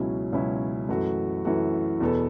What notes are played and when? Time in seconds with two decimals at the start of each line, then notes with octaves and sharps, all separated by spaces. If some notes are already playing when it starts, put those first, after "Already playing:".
Already playing: C#2 B2 F#3 C#4 E4
0.32 C#2 B2 F#3 C#4 E4
0.89 F#2 E3 A3 F#4
1.45 F#2 E3 A3 F#4
2.00 E2 B2 B3 A4